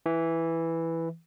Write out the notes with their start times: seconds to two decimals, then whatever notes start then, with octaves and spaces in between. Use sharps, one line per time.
0.06 E3